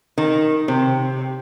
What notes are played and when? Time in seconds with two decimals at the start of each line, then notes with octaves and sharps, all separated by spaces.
0.18 D#3
0.68 C3